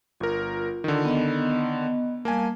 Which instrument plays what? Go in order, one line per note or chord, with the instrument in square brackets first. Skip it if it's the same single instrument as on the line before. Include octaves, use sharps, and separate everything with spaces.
[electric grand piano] G1 A#4 [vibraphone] F4
[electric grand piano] D3 D#3
[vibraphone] B3 D#5
[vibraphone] G3 F5 A5 [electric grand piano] A#3 G#5